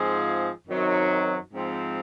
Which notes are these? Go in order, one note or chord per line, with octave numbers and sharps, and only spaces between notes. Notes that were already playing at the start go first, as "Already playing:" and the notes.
Already playing: G#2 F3 C4 F4 G#4
F#2 D#3 F#3 C4 D#4
G#2 F3 C4